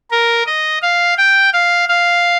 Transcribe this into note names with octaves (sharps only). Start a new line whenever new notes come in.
A#4
D#5
F5
G5
F5
F5